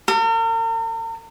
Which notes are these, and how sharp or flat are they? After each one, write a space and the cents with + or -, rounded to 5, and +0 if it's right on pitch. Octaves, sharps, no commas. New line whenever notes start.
A#4 -45